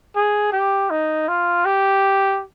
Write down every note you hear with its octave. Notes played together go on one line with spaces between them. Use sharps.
G#4
G4
D#4
F4
G4